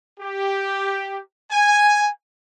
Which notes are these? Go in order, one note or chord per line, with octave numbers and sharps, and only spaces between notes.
G4
G#5